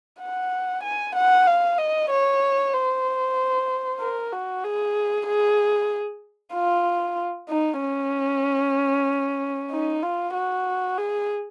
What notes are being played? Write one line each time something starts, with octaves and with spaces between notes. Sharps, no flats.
F#5
G#5
F#5
F5
D#5
C#5
C5
A#4
F#4
G#4
G#4
F4
D#4
C#4
D#4
F4
F#4
G#4